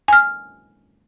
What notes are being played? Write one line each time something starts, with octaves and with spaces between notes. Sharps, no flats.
G#5 F6